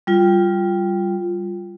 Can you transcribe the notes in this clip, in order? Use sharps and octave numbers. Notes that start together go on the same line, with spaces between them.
G3 F4